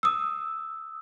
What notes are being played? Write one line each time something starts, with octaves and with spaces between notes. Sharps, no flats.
D#6 E6